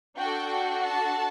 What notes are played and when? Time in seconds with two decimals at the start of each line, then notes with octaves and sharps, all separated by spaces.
0.18 D4 F#4 A4 G5
0.86 A5